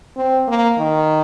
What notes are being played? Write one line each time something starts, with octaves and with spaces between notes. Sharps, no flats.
C4
A#3
D#3